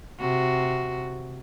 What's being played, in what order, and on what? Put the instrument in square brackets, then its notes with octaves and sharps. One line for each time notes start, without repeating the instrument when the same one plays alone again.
[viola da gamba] C3 F#4